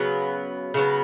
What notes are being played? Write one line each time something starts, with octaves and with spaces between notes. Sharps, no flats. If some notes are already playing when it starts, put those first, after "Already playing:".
Already playing: C#3 F#3 B3
C#3 F#3 B3